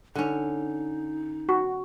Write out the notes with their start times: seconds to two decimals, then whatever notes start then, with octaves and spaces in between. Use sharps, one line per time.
0.15 D3 C#4 D#4
1.49 F#4 C#6